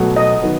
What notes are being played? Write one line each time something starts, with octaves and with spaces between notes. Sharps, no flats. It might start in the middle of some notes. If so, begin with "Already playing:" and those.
Already playing: B2 F#3 A3
D#5
D#3 F#3 B3